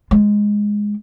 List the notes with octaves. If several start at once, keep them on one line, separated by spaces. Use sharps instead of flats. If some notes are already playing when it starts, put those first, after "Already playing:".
G#3